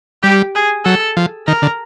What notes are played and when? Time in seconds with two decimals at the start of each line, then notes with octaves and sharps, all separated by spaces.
0.23 G3 G4
0.55 G#4
0.85 F#3 A4
1.17 F3
1.47 D#3 A#4
1.62 D3